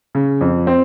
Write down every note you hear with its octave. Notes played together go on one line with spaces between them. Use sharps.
C#3
F2
C4